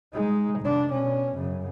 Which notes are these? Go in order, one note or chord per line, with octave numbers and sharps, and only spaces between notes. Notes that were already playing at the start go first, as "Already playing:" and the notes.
G#3 D#4
F1 D4
B2 C#4
F#2 C#3